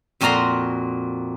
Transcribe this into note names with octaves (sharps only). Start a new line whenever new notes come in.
F2 A#2 F#4 A#4 A#5 C6